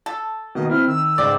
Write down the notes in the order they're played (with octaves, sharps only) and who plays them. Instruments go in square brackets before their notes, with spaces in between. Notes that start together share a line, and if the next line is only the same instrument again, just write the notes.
[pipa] A4
[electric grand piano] B2 D#3 A#3 [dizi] D#5
[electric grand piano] C4 E4 [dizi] F6
[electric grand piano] D#3 [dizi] E6
[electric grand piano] C#2 G#2 G5 [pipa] D5